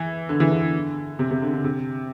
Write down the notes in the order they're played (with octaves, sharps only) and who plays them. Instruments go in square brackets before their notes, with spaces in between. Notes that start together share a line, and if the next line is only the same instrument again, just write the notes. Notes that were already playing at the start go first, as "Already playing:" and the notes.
Already playing: [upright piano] E3
D3
E3
D3
C3
C3
D3
D3
C3